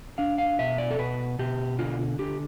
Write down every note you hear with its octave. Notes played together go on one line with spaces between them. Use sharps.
D4 F5
F5
B2 E5
D5
A4
B2 B4
B2 G4
D3 F4
D3 G4